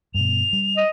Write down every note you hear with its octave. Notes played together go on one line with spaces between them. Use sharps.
G2 B2 F7
G3
D#5